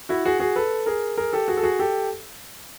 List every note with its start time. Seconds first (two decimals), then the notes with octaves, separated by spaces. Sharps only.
0.09 E4 F#4
0.25 F#4 G#4
0.40 F#4 G#4
0.56 A4 B4
0.86 G#4 A#4
1.17 G#4 A#4
1.33 G4 A4
1.48 F#4 G#4
1.57 A4
1.63 F#4 G#4
1.79 G4 A4